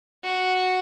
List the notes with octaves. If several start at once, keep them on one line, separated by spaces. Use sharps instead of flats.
F#4